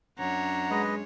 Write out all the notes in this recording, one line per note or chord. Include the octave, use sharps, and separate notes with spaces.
F#2 D4 C#5 F#5 A#5
G#3 B4 D#5